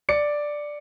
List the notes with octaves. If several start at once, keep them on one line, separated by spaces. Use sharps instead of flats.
D5 C#7